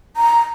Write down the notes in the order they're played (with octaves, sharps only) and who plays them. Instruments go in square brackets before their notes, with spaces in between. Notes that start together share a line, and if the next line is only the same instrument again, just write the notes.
[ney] A#5